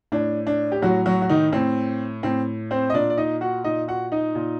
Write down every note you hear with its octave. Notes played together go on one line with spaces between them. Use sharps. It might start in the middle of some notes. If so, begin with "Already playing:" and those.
A2 D4
D4
G4
A2 F#3 F#4
F#3 F#4
F#4
D#3 D#4
A2 C4
A2 C4
C4 C5
D#5
A#2 D4 D5
D5
D#4 D#5
F#4 F#5
A#2 D#4 D#5
F#4 F#5
D#4 D#5
A#2